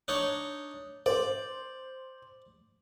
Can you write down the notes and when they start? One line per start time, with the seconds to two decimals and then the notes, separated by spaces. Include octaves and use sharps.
0.08 D4 D#4 C#5
1.06 C5 D5